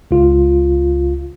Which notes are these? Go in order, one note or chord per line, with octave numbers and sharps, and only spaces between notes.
C#2 F4